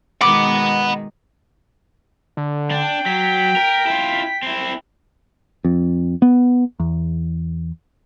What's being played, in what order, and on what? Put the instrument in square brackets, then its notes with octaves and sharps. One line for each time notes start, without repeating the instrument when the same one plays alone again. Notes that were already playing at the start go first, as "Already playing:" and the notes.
[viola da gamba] B2 D#3 G#3 [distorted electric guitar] F#5 B5 [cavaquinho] D6
[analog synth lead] D3
[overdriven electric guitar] D4 [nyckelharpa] G5
[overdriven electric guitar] F#3 [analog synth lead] B6
[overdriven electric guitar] A#4
E4 F4
C4 E4
[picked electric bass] F2
B3
E2